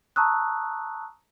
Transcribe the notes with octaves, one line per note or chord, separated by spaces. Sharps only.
A5 A#5 C#6 D#6 E6 F#6